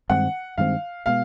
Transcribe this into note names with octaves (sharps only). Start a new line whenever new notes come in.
G2 D#3 G#3 C4 F#5
G2 D#3 G#3 C4 F5
B2 G#3 B3 F5